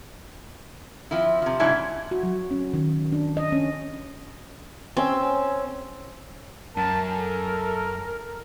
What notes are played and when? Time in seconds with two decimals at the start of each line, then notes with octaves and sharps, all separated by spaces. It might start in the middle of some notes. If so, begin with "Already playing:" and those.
1.11 F3 C4 E4
1.42 C3 F3
1.60 G#2 C#3 F#3 C#4 D4 E4
2.11 F#4
2.23 F#3
2.51 C#4
2.73 D#3
3.12 D4
3.37 D#5
3.52 C#4
4.97 C4 C#4 C6 E6
6.77 F#2 A#4 A5
7.16 A4